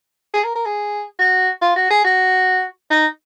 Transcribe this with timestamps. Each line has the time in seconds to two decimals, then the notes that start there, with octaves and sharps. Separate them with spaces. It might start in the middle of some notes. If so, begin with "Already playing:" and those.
0.34 G#4
0.44 A#4
0.55 A#4
0.66 G#4
1.19 F#4
1.61 F4
1.76 F#4
1.90 G#4
2.04 F#4
2.91 D#4